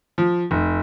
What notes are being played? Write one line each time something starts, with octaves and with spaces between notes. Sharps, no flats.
F3
F1